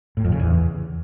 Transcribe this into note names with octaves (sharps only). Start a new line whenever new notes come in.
A2
F2
C#3
E2